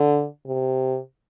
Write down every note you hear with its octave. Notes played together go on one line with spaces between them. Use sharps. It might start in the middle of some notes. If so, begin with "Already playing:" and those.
Already playing: D3
C3